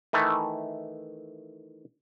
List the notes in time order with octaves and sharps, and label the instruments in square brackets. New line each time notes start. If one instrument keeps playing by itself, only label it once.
[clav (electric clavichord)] D#3 E3 A3